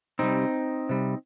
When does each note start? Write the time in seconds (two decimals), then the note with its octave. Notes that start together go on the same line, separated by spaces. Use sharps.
0.19 C3 G3 C4 D#4
0.89 C3 G3